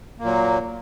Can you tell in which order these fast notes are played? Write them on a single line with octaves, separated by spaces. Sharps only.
A#3 A#2 F#3